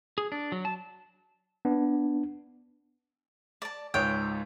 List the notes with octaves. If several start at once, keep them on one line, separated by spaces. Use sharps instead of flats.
G#4
D4
F#3
A5
B3 D4
D5 A5
C#2 G#2 C#5 G5